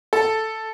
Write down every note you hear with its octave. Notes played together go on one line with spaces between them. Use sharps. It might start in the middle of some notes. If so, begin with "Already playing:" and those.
A4